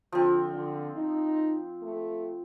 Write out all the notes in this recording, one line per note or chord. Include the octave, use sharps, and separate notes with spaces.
D3 F3 C4
D3
D#4
A3